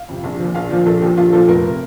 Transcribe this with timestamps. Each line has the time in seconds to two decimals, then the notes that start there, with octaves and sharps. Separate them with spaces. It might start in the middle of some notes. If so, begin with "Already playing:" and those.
Already playing: F5
0.09 F2 C3
0.24 A#1
0.40 A#2 F3
0.54 A#1 F5
0.70 A#2 F3
0.86 A#1 A4
1.02 A#2 F3 G4
1.17 A#1 F4
1.32 A#2 F3 A4
1.48 F1 A#4
1.68 C3